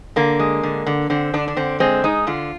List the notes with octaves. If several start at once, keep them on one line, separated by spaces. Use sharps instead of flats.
D3 A#3
G#3
D3
D3
D3 C4
D3 D4
D4
D3 C4
G#3 C4
G#3 D#4
D3 F4